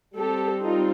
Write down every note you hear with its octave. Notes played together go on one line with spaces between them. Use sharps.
G3 C4 G4 A4
D#4 F4